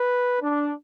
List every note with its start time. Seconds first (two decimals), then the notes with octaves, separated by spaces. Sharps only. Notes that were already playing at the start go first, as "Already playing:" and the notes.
Already playing: B4
0.41 D4